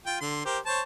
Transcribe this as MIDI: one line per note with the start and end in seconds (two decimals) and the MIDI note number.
0.06 0.18 65
0.06 0.18 79
0.21 0.43 50
0.21 0.43 84
0.45 0.59 67
0.45 0.59 70
0.45 0.59 72
0.66 0.82 72
0.66 0.82 73
0.66 0.82 81